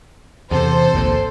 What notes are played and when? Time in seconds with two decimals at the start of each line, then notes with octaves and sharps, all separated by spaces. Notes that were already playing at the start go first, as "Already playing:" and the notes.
0.51 E2 C3 A4 C5
0.93 G#1 D2 A#2